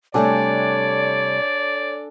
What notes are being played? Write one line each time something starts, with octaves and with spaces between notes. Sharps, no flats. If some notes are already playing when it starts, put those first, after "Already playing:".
C3 G3 A3 D4 A4 C#5 D5 G#5